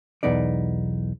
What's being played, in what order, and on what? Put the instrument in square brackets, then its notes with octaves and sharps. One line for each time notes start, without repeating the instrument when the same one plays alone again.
[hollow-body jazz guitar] B1 E2 B3 D#4 D5